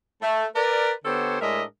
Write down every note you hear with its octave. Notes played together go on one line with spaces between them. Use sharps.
A3
A#4 B4 D5
D3 B3 G4 A4 C5 C#5
A2 G#3 D4 A#4 D#5 E5